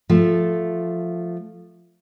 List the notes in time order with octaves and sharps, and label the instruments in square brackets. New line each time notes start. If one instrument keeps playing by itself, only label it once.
[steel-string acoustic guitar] F3 A3